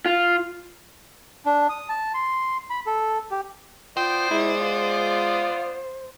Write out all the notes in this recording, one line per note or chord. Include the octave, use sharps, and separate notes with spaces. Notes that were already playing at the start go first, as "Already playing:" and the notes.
F4
D4
D#6
A5
C6
B5
A4
G4
B3 F4 C5 D5 G5 D#6
G#3 E4
F4